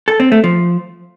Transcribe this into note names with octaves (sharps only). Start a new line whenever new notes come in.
A4
C4
A3
F3